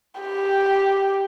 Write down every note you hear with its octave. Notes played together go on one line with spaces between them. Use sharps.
G4